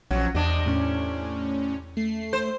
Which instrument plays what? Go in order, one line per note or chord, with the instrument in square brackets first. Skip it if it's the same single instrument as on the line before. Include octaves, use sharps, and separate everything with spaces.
[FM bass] A#1 [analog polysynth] F3 C#4 [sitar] F#3
[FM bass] E2 [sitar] C3 D4 [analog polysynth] D#5
[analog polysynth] A2 C#4
A3 C7
[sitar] C5